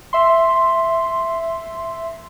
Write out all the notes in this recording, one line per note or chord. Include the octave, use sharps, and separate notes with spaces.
E5 C6